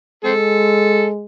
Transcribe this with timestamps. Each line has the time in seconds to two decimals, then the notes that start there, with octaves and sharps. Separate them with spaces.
0.25 G#3 C4 A4